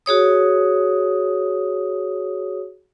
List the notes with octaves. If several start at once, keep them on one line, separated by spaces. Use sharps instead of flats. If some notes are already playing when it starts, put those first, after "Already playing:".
F#4 G#4 C#5 D#6